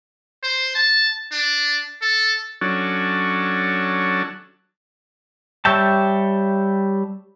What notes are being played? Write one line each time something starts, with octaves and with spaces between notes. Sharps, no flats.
C5
A5
D4
A4
F#3 C#4 D4 F#4 A4
G3 C#5 E5 G5 A5